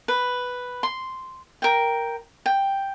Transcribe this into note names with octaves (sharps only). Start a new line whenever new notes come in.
B4
C6
A#4 G5
G5